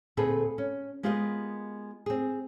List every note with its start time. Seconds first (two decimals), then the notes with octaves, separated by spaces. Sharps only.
0.17 D2 A#2 C4 G#4 A4 B4
0.58 C#4
1.03 G#3 B3 F4 G4 A#4 D#5
2.06 C4 G#4